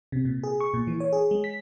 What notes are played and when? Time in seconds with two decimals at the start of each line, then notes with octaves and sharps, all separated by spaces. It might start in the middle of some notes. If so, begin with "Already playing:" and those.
0.12 C3
0.25 A#2
0.43 G#4
0.60 C#6
0.74 A#2
0.87 E3
1.00 C#5
1.13 G#4
1.31 G#3
1.44 B6